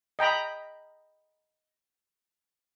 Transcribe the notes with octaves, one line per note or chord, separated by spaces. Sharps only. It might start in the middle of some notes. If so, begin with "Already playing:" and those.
D#5 G5 A#5 B5